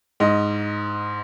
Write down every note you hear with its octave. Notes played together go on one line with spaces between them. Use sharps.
G#2 D#5